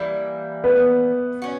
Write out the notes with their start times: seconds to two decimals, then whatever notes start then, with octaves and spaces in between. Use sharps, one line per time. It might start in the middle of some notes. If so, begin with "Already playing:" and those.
Already playing: E3 G3 A#3 E4
0.64 B3
1.42 C#4 F#4